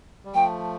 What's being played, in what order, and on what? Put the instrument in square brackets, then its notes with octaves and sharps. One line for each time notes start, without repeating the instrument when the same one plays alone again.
[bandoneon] G3
[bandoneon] F3 A3 [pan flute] G5